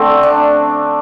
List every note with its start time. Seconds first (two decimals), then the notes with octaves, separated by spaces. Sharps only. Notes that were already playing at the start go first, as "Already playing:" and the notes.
Already playing: D3 A3 C4
0.23 D4